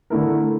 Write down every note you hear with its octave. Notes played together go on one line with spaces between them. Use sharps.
D3 A3 E4 A#4